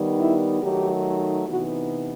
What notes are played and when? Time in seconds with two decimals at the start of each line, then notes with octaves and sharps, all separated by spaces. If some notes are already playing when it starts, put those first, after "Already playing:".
Already playing: D#3 G3 B3 D#4
0.20 E4
0.62 D#3 F#3 A3 D#4 G4
1.47 C3 E3 B3 D#4 F#4